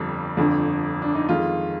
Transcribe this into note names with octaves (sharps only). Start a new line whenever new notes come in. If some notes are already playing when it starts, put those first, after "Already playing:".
Already playing: G1 F2 G3
G1 F2 D3
D4
D#4
F2 D#3 G#3 F4